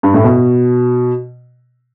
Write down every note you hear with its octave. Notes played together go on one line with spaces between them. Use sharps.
G2
A2
B2